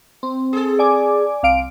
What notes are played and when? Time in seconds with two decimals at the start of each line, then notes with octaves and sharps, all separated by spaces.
0.23 C4
0.53 G#4 A4
0.79 D5 G#5 D6
1.43 C2 F5 D7